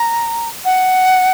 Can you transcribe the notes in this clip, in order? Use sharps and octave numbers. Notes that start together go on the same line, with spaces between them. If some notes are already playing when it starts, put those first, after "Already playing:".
Already playing: A#5
F#5